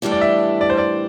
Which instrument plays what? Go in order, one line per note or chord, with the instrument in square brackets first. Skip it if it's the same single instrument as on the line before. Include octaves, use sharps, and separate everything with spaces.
[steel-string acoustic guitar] A2 E3 G3 D4 G4
[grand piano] D5
E5
D5
C5
D5